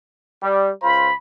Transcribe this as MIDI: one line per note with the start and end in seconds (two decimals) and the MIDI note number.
0.43 0.69 55
0.81 1.09 37
0.81 1.09 65
0.81 1.09 72
0.81 1.16 83